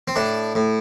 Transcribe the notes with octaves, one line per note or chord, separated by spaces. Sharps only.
C4
A2 D4
A2